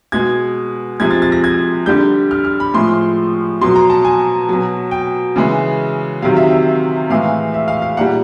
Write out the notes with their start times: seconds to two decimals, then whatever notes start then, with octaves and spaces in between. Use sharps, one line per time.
0.12 B2 G#3 G#6
1.00 C3 F3 G#3 G#6
1.11 A6
1.22 A6
1.32 A#6
1.44 G#6
1.86 D3 G3 G6
2.31 F6
2.45 F6
2.60 B5
2.74 A2 F3 G#3 C6
3.61 B2 F#3 C6
3.76 A#5
3.90 A5
4.05 G#5
4.49 B2 F#3
4.91 G5
5.36 C#3 E3 G#3
6.22 C3 D#3 F#3 F5
6.37 E5
6.51 E5
7.09 A2 E3 G#3 F5
7.54 E5
7.68 F5
7.82 F5
7.97 A#2 G3 F#5